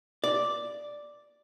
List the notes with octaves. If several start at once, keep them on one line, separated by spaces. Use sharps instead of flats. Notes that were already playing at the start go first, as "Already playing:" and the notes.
D5